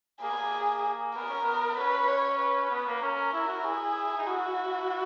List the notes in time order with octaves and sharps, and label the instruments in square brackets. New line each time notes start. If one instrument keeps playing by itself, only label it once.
[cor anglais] A#3 [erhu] G#4
[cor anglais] B3
A#3
[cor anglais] B3 [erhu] A#4
[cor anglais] C#4
B3
[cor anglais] C#4 [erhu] B4
[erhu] C#5
B4
[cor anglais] C#4
B3
A#3
[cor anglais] C#4 [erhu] A#4
[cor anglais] E4
F#4
[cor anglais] E4 [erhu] G#4
[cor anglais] D#4
[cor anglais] E4 [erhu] F#4